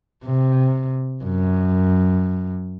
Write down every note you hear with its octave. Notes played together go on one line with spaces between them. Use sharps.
C3
F#2